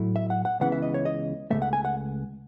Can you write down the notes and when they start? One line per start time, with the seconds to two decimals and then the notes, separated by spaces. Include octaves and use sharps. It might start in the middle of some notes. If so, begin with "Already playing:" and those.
Already playing: A2 F#3 A3 E4
0.16 E5
0.30 F#5
0.45 F#5
0.60 C#2 C#3 E3 B3 F#5
0.72 E5
0.82 D#5
0.94 C#5
1.05 D#5
1.50 C#2 B2 A3 E5
1.62 F#5
1.73 G#5
1.85 F#5